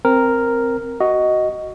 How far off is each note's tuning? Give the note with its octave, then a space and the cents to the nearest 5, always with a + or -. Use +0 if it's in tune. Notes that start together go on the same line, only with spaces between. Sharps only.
C4 +0 A#4 +0
F#4 +10 D#5 +0